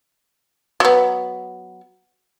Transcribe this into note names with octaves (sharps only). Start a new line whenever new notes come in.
F#3 B3